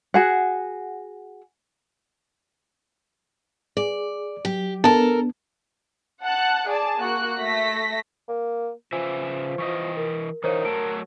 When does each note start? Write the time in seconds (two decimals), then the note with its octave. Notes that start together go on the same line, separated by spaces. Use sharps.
0.14 F#4 G#4 F#5
3.77 G#4 D5
4.45 F#3 G4
4.84 B3 D4 A4 A#4 A5
6.24 F#5 A5 F#6
6.68 G#4 D5 A5
6.99 A#3 F#4 F#6
7.39 A3 A#6 B6
8.29 A#3
8.93 C#3 F3 B4 E5 G#5
9.58 E3 B4 D#5 C#6
9.97 A#4
10.44 E3 D#4 A#4 C5 C#5 F5
10.65 F#3 A3 A4 D7